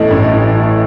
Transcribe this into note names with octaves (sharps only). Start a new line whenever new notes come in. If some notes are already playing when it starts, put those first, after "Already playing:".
Already playing: A1 A2 E3 A3 D#5
A1
D#5
E3
A3